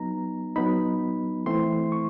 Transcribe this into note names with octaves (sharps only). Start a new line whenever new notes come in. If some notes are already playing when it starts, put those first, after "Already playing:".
Already playing: F#3 B3 D#4 A#5
F#3 B3 D#4 B5
E3 A3 C4 E4 C6
C#6